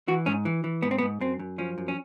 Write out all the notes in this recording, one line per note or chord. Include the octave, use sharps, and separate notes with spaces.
E3 F#4
G#2 C#4
E3
E3
G#2 B3
C4
B3
G#2
F#2 C4
F#2
F3 C#4
F#2
C#4